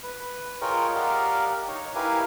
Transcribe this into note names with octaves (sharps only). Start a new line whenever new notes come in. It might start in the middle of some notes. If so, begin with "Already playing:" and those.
B4
F4 G#4 A#4 C#5 D#5 G5
G4 A#4 D5 D#5 F5 F#5
D#4 C#5
E4 G4 A#4 B4 F5 G#5